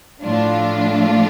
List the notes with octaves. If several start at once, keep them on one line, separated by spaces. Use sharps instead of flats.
A2 F3 D4 F4